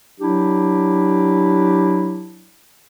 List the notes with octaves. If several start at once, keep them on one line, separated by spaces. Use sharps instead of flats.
F#3 D4 E4 G4